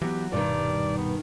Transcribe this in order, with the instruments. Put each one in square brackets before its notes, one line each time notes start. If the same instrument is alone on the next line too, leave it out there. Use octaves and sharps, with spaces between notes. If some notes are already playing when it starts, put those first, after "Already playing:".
[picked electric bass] E3 B3 [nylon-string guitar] F#3 [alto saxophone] G4
[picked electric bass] D#1 B2 G3 [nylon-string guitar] G2 D#3 [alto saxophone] D5
[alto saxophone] B3